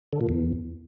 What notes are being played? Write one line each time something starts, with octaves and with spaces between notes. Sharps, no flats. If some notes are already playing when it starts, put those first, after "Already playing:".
D3
A#2
E2